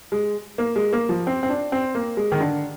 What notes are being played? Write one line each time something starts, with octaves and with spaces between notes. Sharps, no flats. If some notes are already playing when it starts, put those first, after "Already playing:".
G#3
A#3
G#3
A#3
F3
C4
C4
D4
C4
A#3
G#3
D#3
D3